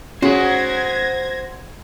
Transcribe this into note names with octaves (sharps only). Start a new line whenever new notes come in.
C#4 F#4 G#4 C5 F#5 G#6 A#6